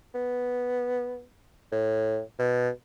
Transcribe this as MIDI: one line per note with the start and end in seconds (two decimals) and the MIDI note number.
0.14 1.23 59
1.72 2.20 45
2.39 2.69 47